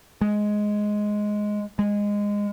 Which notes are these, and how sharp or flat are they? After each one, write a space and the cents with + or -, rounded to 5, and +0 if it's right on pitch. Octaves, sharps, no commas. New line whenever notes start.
G#3 +5
G#3 -15